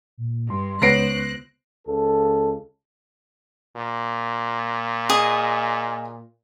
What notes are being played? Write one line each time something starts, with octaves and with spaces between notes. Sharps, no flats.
A#2
G2 C6
C#2 B3 C5 C#5 F#6 A#6 C7 D7
C#2 A4
A#2
G#4 D#5